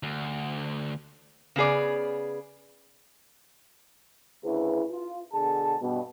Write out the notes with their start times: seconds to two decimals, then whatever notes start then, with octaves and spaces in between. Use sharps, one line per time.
0.03 D2
1.56 C#3 B3 G#4 D5
4.44 D2 C#3 E4 G#4 B4
4.91 F4
5.33 B2 D3 G#4 A5
5.81 G2 B2